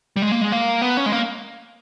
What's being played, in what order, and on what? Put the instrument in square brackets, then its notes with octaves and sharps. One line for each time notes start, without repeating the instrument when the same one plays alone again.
[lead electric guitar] G3
G#3
A#3
G#3
A#3
B3
C#4
G#3
A#3